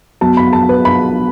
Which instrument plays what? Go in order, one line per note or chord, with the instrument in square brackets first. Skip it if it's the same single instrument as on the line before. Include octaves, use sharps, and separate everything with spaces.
[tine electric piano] F#3 B3 F#4 [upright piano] A5
[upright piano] B5
A5
B4
B5